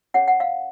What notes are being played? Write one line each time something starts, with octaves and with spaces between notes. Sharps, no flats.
C#4 G#4 C#5 F#5
F#5
F5